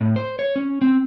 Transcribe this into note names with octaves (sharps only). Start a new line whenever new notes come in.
A2
C5
C#5
C#4
C4